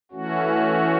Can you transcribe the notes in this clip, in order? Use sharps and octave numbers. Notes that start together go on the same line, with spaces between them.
E3 A3 C#4 F#4